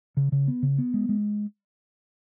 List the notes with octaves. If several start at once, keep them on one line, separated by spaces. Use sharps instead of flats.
C#3
C#3
B3
C#3
B3
G#3
G#3